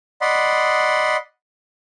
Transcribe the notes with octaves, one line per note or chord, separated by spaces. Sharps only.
D5 D#5 F#5 B5 C6